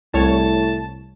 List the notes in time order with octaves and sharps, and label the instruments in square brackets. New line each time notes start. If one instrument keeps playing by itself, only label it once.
[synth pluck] C2 C#5 [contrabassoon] A2 [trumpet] A5